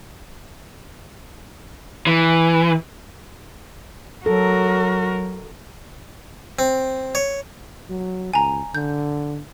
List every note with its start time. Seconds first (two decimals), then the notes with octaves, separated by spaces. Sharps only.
2.07 E3
4.26 F#3 F#4 A4 A#4
6.59 C4
7.15 C#5
7.90 F#3
8.33 C#2 G#5 A#5
8.75 D3 G6